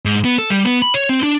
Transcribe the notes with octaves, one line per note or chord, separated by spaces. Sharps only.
G#2
B3
A4
G3
B3
B5
C#5
C4
D4